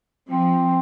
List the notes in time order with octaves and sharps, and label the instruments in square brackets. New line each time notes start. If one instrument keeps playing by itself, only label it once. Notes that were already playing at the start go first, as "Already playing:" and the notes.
[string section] F3 [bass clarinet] C4